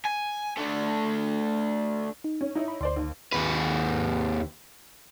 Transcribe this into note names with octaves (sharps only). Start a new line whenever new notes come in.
G#5
A3 D4
D#4
C#4
D#4 E4 C#5
B5
D2 C5 D5 C6
D#2
D#2 B4